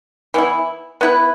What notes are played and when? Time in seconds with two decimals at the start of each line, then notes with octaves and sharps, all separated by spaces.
0.34 E3 B3 E4
1.01 B3 E4 B4